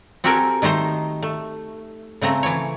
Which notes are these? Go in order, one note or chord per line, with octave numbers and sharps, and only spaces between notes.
C4 F#4 G4 A4 A#4 G#5
D#3 A3 D#4 C5 A#5
A3
C#3 A3 C4 A#5
E3 C#5